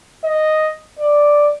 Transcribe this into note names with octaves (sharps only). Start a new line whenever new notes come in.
D#5
D5